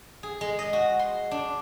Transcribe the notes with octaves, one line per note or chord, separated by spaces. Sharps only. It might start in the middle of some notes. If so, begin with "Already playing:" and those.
G#4
G#3
D#5
F#4
C6
D4